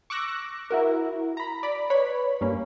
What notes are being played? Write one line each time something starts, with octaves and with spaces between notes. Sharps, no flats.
C#6 D6 E6 F#6 A#6
E4 F#4 A#4
A#5 B5
D5 B5
B4 C#5 B5
G2 A#3 C#4